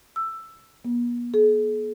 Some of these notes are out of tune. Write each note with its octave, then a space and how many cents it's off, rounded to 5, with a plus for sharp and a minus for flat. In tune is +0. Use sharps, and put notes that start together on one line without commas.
E6 +10
B3 -45
G#4 +45